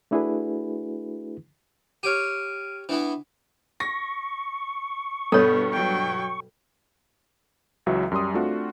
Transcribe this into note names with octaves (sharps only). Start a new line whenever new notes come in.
A3 D4 E4 F#4 G#4 B4
G4 C#5 F6 D7 D#7
E3 B3 D4 E4
C#6 A#6
G2 B2 G3 B3 A4 C#5
F#3 G5
C#2 E3 F#3 F#4 E5
F#2 G3 C6 D#6
A3 C4 D4 F4 F#4